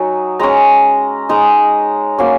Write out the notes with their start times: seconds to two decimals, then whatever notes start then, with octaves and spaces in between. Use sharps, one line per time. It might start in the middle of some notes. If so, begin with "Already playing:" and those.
Already playing: F#3 D#4 G#5
0.40 G#3 C#4 A#5
1.29 G#3 D#4 A#5
2.18 F#3 A#3 C#4 G#5